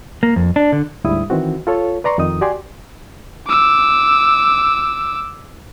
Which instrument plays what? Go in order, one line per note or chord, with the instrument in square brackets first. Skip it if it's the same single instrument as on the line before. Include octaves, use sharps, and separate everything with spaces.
[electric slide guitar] A#3
F2
D4
D3
[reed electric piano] D2 G#2 G3 E4 D#6
D#3 E3 C4 F#4
F4 A4 C#5
B4 D5 A#5 C6 C#6
F2 D#3 D#4 D#6
F#4 G4 D5 G#5 C6
[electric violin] D6 E6